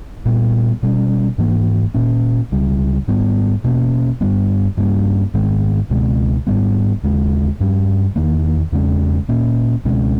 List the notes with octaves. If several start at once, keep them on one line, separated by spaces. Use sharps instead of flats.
A#2 G3 B3
B2 G3 C#4
G#2 E3 A#3
A#2 A#3 C#4
C#2 C#3 G3
G#2 G3 B3
B2 A#3 C#4
G2 G3 B3
G2 G3 A#3 C#4
G#2 D#3 G#3 B3
C#2 B2 G#3 B3
G#2 G3 B3
D#2 C#3 G#3
G2 G3 C#4
E2 D#3 A#3
E2 C#3 G#3 C#4
A#2 A#3 C#4
C#2 B2 G#3 C#4